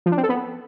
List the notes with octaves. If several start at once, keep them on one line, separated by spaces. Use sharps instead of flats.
F3
D4
C4
A4
B3